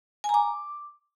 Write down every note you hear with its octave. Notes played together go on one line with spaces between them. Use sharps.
G#5
A#5
D6